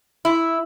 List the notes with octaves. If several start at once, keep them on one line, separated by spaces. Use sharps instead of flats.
E4